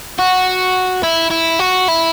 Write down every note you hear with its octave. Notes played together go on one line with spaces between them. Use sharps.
F#4
E4
E4
F#4
E4